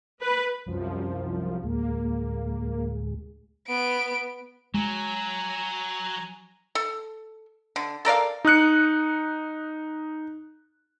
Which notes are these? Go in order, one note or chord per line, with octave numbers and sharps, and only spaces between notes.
B4
C2 F#2 F3
D2 A2 G#3 A#3
B3 D7
F#3 G#3 G#5 A#5
A4
D3
A4 A#4 D5 F5
D#4 D#6 F#6 C#7